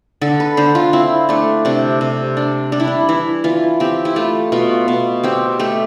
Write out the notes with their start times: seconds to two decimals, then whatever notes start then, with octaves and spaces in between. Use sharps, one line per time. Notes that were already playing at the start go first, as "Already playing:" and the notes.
0.21 D3 A4
0.40 B4
0.57 D3 C5
0.75 F4
0.93 C4 E4
1.29 A3 D4
1.65 C3 D4
2.01 C3
2.37 D4
2.72 G3 D4
2.80 E4
2.87 D4
3.09 E3 E4
3.44 E3 F4
3.80 C4 G4
4.05 E4
4.16 A3 F4
4.52 B2 F4
4.88 B2
5.23 C4 G4
5.59 A3 G4